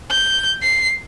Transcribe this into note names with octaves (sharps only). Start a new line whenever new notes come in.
G6
C7